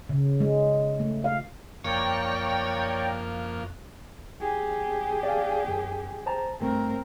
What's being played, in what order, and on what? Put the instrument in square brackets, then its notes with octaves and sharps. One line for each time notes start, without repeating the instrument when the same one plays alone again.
[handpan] C#3
G#3
A3
F5
[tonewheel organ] F#2 [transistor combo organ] F3 A#3 [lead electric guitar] C#5 [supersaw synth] D5 G5 A#5
[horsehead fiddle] G4 G#4
[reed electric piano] D5 F5
F#2
C5 A5 A#5
[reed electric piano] G2 A3 [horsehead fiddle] C4 A#4